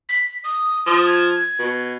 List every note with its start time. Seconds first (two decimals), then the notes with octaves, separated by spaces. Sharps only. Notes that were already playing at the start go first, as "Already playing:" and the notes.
0.09 B6
0.44 D#6
0.86 F3 D#6
1.07 G#6
1.59 B2